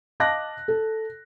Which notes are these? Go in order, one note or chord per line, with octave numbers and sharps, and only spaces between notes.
D#5 F5 A5 D6 F#6 A#6
A4